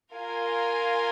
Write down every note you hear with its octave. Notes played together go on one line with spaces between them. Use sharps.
F4 A#4 F5 G#5